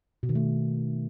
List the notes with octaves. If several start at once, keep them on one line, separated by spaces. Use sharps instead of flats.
B2
D#3
A3